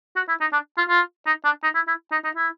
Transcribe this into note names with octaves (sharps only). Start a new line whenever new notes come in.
F#4
E4
D#4
D4
F4
F4
D#4
D4
D#4
E4
E4
D#4
D#4
E4